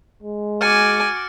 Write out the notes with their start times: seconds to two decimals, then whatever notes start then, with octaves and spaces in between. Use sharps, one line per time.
0.23 G#3
0.61 F#4 G#5 D6 F6 A6 C#7